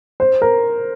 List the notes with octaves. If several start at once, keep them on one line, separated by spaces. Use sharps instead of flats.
C5
A#4